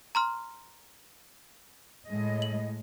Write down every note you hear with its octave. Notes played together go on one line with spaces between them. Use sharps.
A#5 C6 F6
A2 G#3 D#5
F#7